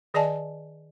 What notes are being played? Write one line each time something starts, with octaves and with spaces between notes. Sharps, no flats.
D#3 G#4 D5 D#5 G#5 A5